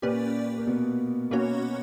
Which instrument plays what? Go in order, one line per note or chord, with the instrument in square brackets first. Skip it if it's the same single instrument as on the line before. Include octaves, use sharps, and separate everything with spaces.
[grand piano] A#2 A#3 [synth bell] C#4 G4 B4 D5
[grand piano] A#3
B2 B3
[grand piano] B2 B3 [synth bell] A#3 C#4 F#4 C#5